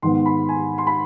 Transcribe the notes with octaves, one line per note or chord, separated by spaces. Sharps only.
G#2 D#3 B3 C6
B5
G#5
C6
B5